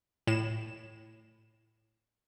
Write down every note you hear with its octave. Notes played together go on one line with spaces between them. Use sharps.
A2 E7